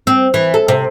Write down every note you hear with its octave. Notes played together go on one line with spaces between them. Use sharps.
C4
E3
A4
C3